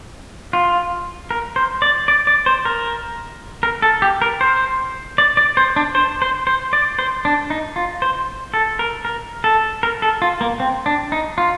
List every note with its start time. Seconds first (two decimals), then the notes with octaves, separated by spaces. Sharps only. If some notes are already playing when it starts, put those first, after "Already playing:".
0.53 F4
1.31 A#4
1.56 C5
1.82 D5
2.08 D5
2.27 D5
2.46 C5
2.65 A#4
3.63 A#4
3.82 A4
4.02 G4
4.22 A#4
4.41 C5
5.18 D5
5.37 D5
5.57 C5
5.76 D4
5.95 C5
6.22 C5
6.47 C5
6.73 D5
6.99 C5
7.25 D4
7.50 D#4
7.76 F4
8.02 C5
8.54 A4
8.79 A#4
9.05 A#4
9.44 A4
9.83 A#4
10.02 A4
10.22 F4
10.41 A#3
10.60 C4
10.86 D4
11.12 D#4
11.38 F4